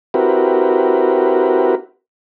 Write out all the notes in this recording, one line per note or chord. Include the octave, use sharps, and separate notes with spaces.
C4 E4 F#4 G4 A#4 B4